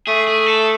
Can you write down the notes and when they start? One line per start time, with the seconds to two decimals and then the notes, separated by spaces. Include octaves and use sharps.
0.07 A3 G#4
0.27 G#4
0.46 A4